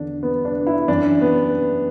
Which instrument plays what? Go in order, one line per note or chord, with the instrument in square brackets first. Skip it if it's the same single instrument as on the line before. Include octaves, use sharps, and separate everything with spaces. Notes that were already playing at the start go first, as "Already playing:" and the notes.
Already playing: [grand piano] E2 D3 D4
B3
D4
E4
F#2 E3 D4
B3